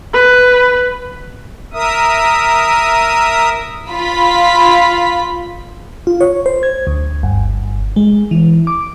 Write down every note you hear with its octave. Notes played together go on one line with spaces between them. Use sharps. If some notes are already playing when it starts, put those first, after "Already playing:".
B4
A#4 E5 D#6
F4 B5 B6
F4
C#5
C5
G#6
D2
G1
G#3
E3
D6